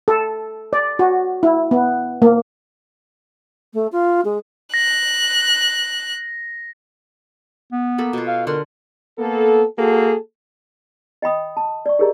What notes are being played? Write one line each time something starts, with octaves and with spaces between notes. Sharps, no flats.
A4
D5
F#4
E4
B3
A#3
A3
F4
G#3
F#6 A#6
B3
A#3 A4 B5
B2 F4
F5
D3 A#4 F#5 C6
A#3 B3 A4
A#3 F#4 G#4 A4
D#5 G5 B5 D#6
A5
D5 C#6
G4 G#4 A#4 C#5 D#5 A#5